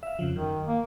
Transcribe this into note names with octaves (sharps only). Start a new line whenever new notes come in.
E5 F5
F2 C#3 F3
F#2 D#3
A#3